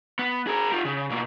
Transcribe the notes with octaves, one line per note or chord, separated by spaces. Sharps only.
B3
G#4 A#4
F4 G4
C#3
B2 A#3